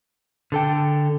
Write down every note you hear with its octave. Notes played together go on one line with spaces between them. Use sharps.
D3 A4 G5